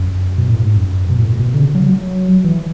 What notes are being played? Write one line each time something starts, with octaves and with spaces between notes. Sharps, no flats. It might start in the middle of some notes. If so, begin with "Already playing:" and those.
Already playing: F#2
B2
A2
G#2
F#2
B2
A2
B2
D3
C#3
F#3
F#3
E3